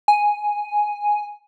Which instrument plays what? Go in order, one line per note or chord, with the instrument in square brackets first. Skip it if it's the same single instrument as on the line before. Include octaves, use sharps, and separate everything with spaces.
[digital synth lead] G#5